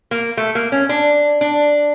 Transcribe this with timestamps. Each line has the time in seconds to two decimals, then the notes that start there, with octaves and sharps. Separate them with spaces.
0.11 A#3
0.37 A3
0.55 A#3
0.72 C#4
0.89 D4
1.41 D4